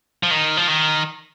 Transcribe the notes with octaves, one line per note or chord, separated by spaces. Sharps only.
F3
D#3
F3
D#3